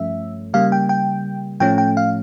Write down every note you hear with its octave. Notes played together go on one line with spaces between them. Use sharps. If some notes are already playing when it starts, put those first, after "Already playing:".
Already playing: G2 F3 A3 C#4 E5
C#3 G3 A#3 F5
G5
G5
A2 F3 A3 C#4 G5
G5
F5